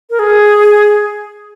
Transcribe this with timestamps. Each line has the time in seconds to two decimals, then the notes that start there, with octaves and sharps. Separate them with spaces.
0.10 A#4
0.19 G#4